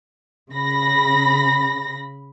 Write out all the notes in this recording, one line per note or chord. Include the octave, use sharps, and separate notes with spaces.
C#3 B5 A#6